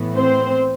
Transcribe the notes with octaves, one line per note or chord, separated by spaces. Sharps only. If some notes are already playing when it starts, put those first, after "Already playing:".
Already playing: A2 E3 B3
C4 C5